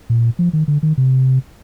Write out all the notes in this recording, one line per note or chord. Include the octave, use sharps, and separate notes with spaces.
A#2
F3
D#3
D3
D#3
C3